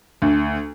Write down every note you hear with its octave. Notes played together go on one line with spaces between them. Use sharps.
D2